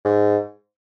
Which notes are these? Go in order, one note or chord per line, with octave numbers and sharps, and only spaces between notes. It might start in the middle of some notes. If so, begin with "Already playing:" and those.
G#2